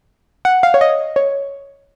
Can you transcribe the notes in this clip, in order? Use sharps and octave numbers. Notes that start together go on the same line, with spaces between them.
F#5
F5
C#5
D#5
C#5